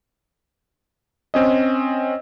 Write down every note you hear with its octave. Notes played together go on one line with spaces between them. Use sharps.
C4 C#4 D#5